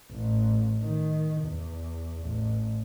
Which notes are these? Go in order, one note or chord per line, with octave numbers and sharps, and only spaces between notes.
A1
D#3
E2
A1